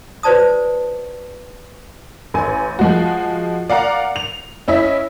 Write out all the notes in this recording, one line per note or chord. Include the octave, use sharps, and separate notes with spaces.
F#4 B4 C5 D5 A5 D#6
A1 G#5
F3 G#3 F#4
D5 F5 F#5 A#5 D6
F7
C#4 E4 D#5 E5